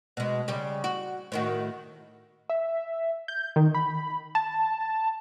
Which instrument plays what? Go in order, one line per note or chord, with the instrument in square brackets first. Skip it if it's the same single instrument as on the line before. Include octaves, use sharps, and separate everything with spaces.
[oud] B2 G#3
C#3 G3
F#4
A2 D#3 F#4
[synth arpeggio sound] E5
G6
D#3
B5
A5